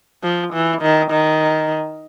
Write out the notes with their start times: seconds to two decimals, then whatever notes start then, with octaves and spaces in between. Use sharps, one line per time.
0.23 F3
0.53 E3
0.82 D#3
1.11 D#3